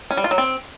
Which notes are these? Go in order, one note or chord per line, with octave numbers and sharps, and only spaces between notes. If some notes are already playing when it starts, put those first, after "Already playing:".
C#4
G3
F4
F#3
C4